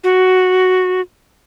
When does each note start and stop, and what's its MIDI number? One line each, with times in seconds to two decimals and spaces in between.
0.04 1.01 66